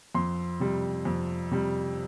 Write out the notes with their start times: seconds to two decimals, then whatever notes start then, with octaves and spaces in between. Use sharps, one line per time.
0.15 F2 C6
0.60 C3 G3
1.05 F2
1.51 C3 G3